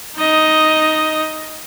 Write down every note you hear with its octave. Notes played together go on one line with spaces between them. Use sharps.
D#4 D#5